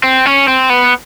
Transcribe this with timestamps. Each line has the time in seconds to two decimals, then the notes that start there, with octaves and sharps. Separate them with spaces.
0.04 C4
0.26 C#4
0.48 C4
0.70 B3